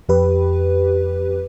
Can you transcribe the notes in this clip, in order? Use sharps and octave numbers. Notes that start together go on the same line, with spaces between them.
F2 G4 B4